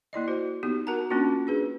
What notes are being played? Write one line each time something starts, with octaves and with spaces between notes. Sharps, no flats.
A#3 E4 D5 D#5
F#4 C5
B3 D#4 G4
F#4 A#4 F#5 A5 A#5
A#3 C#4 D4 F4 F#4
D4 G#4 B4